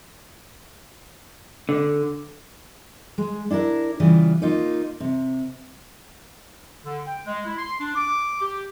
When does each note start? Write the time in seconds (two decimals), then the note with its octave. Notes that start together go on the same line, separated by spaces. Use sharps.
1.69 D3
3.18 G#3
3.51 D4 E4 A4 A#4
4.00 C#3 E3 G3 F4
4.42 A#3 D#4 F4
5.00 C3
6.85 D3
7.06 G5
7.26 G#3
7.45 E4
7.58 C6
7.80 D4
7.96 D6
8.41 G4